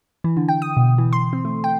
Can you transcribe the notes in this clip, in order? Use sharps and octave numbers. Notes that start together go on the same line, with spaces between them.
E3
D3
G5
D#6
B2
E3
C6
C4
A3
G5